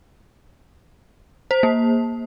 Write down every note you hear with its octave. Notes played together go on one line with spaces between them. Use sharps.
C5
A#3